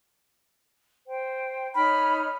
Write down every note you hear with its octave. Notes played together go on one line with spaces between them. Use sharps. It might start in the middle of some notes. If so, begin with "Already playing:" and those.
C5 G5
D#4 C#5 B5 F6